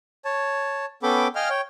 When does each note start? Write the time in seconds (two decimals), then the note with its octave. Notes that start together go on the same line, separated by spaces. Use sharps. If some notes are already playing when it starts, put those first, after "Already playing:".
0.25 C#5 A5
1.03 B3 C#4 A4 G5 B5 D6
1.35 D#5 F5 G5 G#5 F6
1.49 C#5 G5